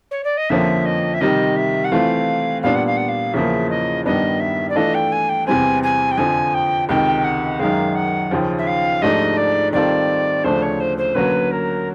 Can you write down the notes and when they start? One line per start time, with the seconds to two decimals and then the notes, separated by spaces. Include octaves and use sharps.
0.11 C#5
0.24 D5
0.37 D#5
0.49 F2 D3 F3 A#3 C#4 E5
0.86 D#5
1.14 E5
1.21 C3 D#3 G3 D#5
1.56 E5
1.84 F#5
1.92 E3 A3 C4 F4 F5
2.62 A#2 G3 B3 D4 F5
2.75 F#5
2.86 F5
2.97 F#5
3.08 F5
3.34 E2 C#3 F3 A#3 E5
3.70 D#5
4.05 G2 D#3 G3 B3 D4 D#5
4.40 E5
4.69 D5
4.76 E3 A3 D4 F4 A4 D#5
4.94 G5
5.12 G#5
5.29 G5
5.47 E2 C3 E3 G3 C4 G#5
5.83 G#5
6.11 G5
6.17 F2 D3 F3 G#5
6.54 G5
6.89 C#2 C3 D#3 G5
7.24 F#5
7.60 F#2 D#3 G#3 F5
7.95 F#5
8.31 D#2 C#3 F3
8.58 E5
8.67 F5
9.02 G#2 F3 A3 D4 G4 D#5
9.37 D5
9.73 D#3 G3 C4 F4 A4 D5
10.44 D2 C#3 F3 A3 D4 C5
10.62 C#5
10.80 C5
10.98 C5
11.15 D3 F#3 A#3 C#4 F#4 B4
11.51 A#4